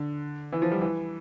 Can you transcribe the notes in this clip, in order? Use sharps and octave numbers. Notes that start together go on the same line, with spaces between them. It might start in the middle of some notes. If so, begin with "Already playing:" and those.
Already playing: D3
E3
F3
G3
E3